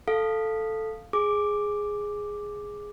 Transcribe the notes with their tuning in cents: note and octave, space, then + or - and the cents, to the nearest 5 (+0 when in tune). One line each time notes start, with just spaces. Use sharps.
A4 +0 F5 +0
G#4 +0 D6 +0